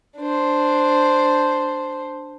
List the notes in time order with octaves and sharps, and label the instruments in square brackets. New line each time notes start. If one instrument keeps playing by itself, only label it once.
[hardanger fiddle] D4 C5